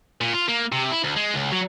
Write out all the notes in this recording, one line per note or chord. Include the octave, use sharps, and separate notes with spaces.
A#2
F4
A#3
C3
E4
D2
G#3
C#2
F#3